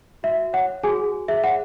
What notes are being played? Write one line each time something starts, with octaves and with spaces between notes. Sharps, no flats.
F#4 E5
F#4
C#5 F#5
C#5
F#4 G#4 G#5
F#4
G#4
G#4 E5
C#5 F#5